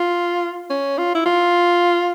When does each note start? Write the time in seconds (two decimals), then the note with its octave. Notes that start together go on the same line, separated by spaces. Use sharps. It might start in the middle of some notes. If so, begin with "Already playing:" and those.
Already playing: F4
0.70 C#4
0.98 F4
1.15 E4
1.26 F4